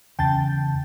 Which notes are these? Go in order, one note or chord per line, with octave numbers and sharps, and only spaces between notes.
E2 C#3 G5 A5 G6 A6